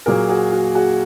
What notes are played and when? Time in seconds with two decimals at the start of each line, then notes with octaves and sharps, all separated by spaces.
0.06 A#2 F#3 A#3 G#4 A#4
0.29 F#4 G#4
0.52 F#4
0.75 F#4 G#4